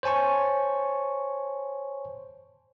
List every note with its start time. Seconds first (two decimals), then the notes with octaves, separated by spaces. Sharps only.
0.03 C5 C#5 G#5 A5 C#6